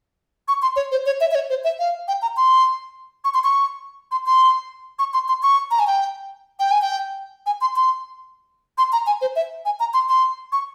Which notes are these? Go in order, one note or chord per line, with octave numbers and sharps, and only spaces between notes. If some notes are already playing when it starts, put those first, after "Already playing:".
C#6
C6
C#5
C5
C#5
E5
E5
C#5
C5
E5
F5
G5
A#5
C6
C#6
C6
C#6
C6
C6
C#6
C6
C6
C#6
A#5
G#5
G5
G5
G#5
G5
G#5
C6
C6
C6
A#5
G#5
C5
E5
G#5
A#5
C6
C6
C#6